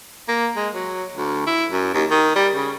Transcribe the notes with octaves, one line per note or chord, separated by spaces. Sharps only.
A#3
G#3
F#3
D2
E4
F#2
D#2
D#3
G3
C#3